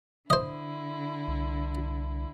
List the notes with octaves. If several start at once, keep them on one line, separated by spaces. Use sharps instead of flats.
D3 E4 C5 D#5
C2